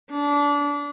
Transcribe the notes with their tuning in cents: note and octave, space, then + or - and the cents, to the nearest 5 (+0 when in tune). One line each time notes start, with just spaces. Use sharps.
D4 -25